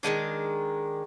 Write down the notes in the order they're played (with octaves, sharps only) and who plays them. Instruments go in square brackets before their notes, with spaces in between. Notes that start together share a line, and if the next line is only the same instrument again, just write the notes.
[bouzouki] D#3 E3 G#3 D4